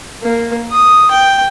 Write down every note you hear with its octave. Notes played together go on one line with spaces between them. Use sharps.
A#3
D#6
G5